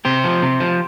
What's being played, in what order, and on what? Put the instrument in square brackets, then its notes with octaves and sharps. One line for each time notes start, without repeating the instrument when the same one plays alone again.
[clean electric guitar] C3 G4 C5
F3
C3
F3